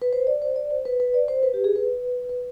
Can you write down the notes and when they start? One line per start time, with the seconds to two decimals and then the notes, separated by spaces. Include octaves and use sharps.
0.02 B4
0.13 C5
0.27 D5
0.42 C5
0.56 D5
0.71 C5
0.85 B4
1.00 B4
1.14 D5
1.28 C5
1.43 B4
1.54 G4
1.64 G#4
1.76 B4
2.29 B4